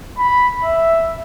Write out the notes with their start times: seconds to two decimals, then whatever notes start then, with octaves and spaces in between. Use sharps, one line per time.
0.18 B5
0.64 E5